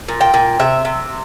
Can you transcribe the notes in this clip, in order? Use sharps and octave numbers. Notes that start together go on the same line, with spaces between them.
A#2
G5
A#2
C3 E5
C3